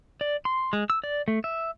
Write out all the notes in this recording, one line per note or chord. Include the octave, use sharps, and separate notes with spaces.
D5
C6
G#3
E6
D5
A3
E5